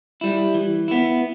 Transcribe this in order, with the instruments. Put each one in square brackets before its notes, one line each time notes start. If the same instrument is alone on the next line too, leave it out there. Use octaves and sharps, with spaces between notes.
[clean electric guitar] G3 E4
E3
B3 E4